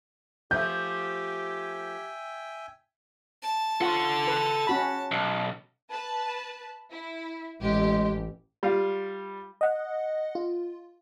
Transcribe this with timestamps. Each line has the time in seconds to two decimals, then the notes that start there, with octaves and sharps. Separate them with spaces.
0.51 F3 A3 G4 E5 G5 G#5 G6
3.43 A5
3.81 F4 A4 F#5 C#6
4.28 B4
4.67 C#4 F#4 B5
5.11 B1
5.90 B4 A5
6.91 E4
7.62 A1 G#3 G4
8.63 G3 F4
9.61 D#5 F#5
10.35 F4